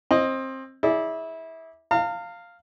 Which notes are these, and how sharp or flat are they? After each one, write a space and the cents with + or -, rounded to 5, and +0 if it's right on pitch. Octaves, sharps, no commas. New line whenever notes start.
C4 +20 D#5 +0
E4 -25 G#4 +0 D5 +0
F5 +0 A#5 -45